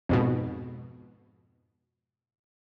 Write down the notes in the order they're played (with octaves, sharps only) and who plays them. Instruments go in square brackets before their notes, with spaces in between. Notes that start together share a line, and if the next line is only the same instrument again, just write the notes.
[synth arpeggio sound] F2 G#2 B2